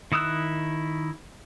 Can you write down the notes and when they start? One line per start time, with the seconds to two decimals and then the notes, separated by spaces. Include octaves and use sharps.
0.12 D#3 E4 D#6 E6 F#6